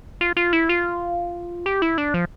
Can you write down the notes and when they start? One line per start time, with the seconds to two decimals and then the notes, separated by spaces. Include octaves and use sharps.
0.21 F4
0.37 F4
0.53 E4
0.69 F4
1.66 G4
1.82 E4
1.98 D4
2.14 F3